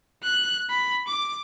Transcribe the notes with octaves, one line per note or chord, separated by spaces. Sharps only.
F#6
B5
D6